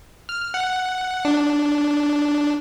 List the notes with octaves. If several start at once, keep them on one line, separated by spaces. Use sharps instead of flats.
F6
F#5
D4